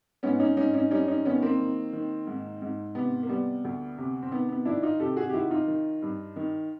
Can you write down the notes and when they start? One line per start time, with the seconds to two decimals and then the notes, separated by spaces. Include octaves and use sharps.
0.23 G#2 B3 C#4
0.39 C#4 D#4
0.57 G#2 C#4 D#4
0.74 C#4 D#4
0.91 G3 C#4 D#4
1.08 C#4 D#4
1.25 D#3 B3 C#4
1.42 A#3 C4
1.60 D#3
1.93 D#3
2.27 G#2
2.62 G#2
2.95 C3 B3
3.23 A#3
3.29 G3 B3
3.64 D2
3.98 C3
4.22 C4
4.32 D#3 B3
4.49 B3
4.65 D#3 D4 E4
4.83 D#4 F4
4.99 C3 G4 A4
5.16 F#4 G#4
5.29 G4
5.34 D#3 E4 F#4
5.51 D#4 F4
5.68 D#3
6.02 G2
6.36 D#3